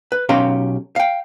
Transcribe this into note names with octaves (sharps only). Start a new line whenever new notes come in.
B4
B1 C#4 G4 F5 A#5 C6
F5 G5